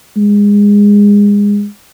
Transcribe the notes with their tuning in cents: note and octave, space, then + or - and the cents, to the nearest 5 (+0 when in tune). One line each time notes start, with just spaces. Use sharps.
G#3 -25